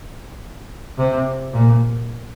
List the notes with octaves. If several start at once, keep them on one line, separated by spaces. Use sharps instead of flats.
C3
A#2